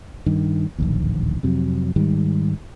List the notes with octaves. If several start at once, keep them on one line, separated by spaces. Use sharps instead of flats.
G2 D#3
D1 A#1 D#2
F2 C3 F#3
G#2 D#3 G3